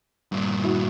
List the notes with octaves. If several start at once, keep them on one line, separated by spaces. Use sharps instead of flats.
G2 A#2
E4 F#4